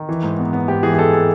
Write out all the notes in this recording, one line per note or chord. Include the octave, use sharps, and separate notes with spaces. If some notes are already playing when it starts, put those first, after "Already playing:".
Already playing: D#3
E3
G#2
B3
B3
G#2 G4
E3 G#4
G#4
G#3 A4
A4